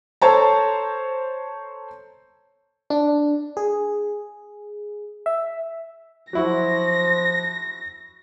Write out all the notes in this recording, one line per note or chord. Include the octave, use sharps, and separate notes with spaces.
A4 C5 C#5 A5 A#5
D4
G#4
E5
F3 F#3 E4 F#4 A#6